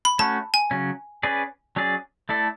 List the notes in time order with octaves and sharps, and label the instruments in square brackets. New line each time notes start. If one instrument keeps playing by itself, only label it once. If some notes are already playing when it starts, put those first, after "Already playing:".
[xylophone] B5
[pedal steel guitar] A3 C#4 F#4 [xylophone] A5
[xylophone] G#5
[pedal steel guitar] C#3 F#3 C#4
C#4 G#4 B4 D5
F#3 C#4 G#4 D5
A3 E4 A4 D5